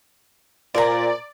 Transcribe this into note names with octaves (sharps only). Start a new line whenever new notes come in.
A#2 C5 D5 G#5 A#5